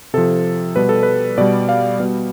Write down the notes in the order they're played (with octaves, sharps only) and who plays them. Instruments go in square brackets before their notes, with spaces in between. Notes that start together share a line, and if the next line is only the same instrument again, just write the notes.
[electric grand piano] C3 F3 A4
B2 G3 B4
A4
B4
B2 G3 D5
F5
B2 G3